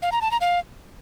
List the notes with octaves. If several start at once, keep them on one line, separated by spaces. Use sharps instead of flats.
F5
A#5
A5
A#5
F5